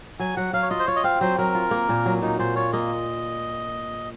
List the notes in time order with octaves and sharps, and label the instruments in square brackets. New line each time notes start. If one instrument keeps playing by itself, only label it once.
[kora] F#3 [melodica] G#5
[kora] F#3 [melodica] F#5
[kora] F#3 [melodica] F5
[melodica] C#5
[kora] F4 [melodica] D#5
[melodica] C5
[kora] F4 [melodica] C#5
[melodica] D#5
[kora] C4 [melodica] F5
[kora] F#3 [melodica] C5
[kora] F#3 [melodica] A#4
[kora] F4
A#3
A#2
F#3
[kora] A#2 [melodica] D#4
[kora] A#2 [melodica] C5
[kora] F4 [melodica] C#5
[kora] A#3 [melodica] D#5